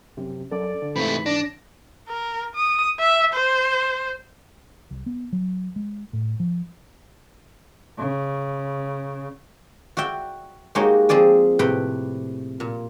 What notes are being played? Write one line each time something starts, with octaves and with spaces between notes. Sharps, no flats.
F#2 C3
F#2 A4 D5
D3
G#2 C3 E3 A3 B5
D4 D5 A#6
A#4
D#6
E5
C5
C2
B3
F#3
G#3
A2
F3
C#3
F#4 D5 E5 G5
G#3 A#3 D#4 F#4 G4 C#5
F3 C4 G#4 D5 G#5
A2 C3 B4 G5
A#2